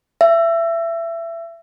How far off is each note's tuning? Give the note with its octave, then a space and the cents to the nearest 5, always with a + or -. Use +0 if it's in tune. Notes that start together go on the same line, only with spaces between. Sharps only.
E5 +25